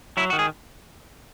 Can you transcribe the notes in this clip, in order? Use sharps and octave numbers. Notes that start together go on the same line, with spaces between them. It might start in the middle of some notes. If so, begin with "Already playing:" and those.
F#3 E4
D#3 F#4
G#4